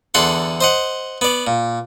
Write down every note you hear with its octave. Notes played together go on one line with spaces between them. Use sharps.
E2 D3 A4 F#5 C6
C5 D#5 F#5
B3 D5
A#2